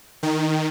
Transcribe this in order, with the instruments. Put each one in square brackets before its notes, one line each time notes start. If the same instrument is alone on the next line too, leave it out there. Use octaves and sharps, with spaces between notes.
[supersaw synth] D#3